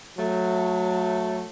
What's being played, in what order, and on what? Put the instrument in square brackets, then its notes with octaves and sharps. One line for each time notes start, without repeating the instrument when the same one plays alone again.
[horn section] F#3 A3